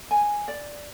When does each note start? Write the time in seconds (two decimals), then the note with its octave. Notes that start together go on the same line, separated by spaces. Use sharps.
0.11 G#5
0.48 D5